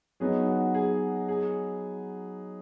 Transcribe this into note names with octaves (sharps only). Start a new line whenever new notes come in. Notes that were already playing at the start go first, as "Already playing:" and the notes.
F#3 B3 D#4 G#4
F#4
G#4
G#4